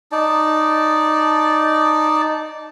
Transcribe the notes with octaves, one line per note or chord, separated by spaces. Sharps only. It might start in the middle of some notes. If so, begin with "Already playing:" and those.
D#4 D5 A5